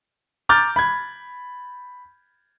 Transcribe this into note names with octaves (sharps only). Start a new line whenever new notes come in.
A#5 D6 F6 G6 A6
B5 G#6